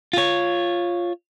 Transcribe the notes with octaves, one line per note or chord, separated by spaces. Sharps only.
F4 C#5